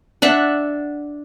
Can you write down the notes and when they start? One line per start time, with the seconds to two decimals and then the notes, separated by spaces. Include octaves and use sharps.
0.22 D4 E5 F#5